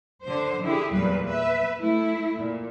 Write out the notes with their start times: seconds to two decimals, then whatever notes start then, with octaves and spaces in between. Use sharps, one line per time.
0.23 D3 C5
0.62 D3 E4 G4 G#4
0.92 E2 A#2 F#3 G3 B4
1.27 B4 E5
1.80 A3 E4
2.37 A#2